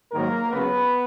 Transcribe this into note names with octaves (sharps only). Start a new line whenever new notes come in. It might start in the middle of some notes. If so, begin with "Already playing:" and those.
G#2 D#3 F#3 A#3 A#4
C#2 C#3 F#3 B3 B4